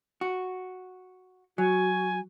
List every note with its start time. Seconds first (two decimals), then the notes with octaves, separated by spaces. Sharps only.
0.21 F#4
1.58 F#3 F#4 G#5